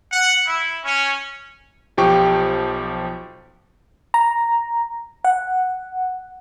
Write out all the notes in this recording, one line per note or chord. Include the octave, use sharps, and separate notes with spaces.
F#5
E4
C#4
B1 F3 G4 G5 C#6
A#5
F#5